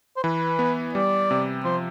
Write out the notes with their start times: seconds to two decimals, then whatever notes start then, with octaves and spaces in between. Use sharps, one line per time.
0.17 C5
0.23 E3 B4
0.59 B3
0.95 G3 D5
1.31 C3
1.65 F3 C5